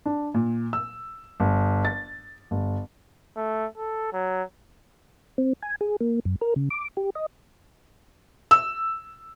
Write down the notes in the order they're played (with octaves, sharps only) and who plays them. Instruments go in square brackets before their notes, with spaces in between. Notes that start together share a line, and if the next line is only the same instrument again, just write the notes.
[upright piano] D4
A#2
E6
G1
A6
G1
[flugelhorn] A3
A4
F#3
[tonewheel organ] C4
G#5
G#4
A#3
F#2
A#4
C#3
D6
G4
D#5
[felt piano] E6